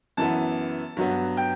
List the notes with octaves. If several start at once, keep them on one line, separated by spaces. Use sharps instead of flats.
F#2 E3 B3 A5
G2 F#3 B3
G5